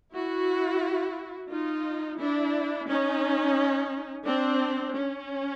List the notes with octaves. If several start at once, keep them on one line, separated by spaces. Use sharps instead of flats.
E4 F#4
D#4 F4
D4 E4
C#4 D#4
C4 D4
C#4